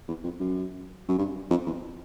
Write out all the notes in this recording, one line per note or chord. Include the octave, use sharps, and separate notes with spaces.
E2
F2
F#2
F#2
G2
F2
E2